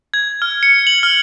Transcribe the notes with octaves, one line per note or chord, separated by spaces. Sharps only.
G#6
F6
C#7
F#7
F6